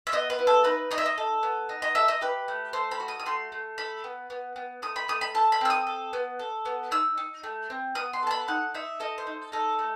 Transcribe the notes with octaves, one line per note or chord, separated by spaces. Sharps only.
E5
B3 D#5
B4
E4
A4
D#4 B4
D#4 D#5
E5
D#5
A4
B3
D#4
D#5
A4 E5
D#5
G4 B4
A3
A4 C5
B5
F#4
D#6
D#6
A3 C6
A3
A4 B5
B3
B3
B3
A3 D#6
B5
A3 D#6
B5
A4 A5
B5
C4 E6
D#6
A4
B3
A4
B3
D#4 E6
D#4
A3
C4
B3 D#6
C6
A4 A5
B5
D#4 F#5
D#4 E5
A4 D#5
C5
D#4
D#4 A4
A3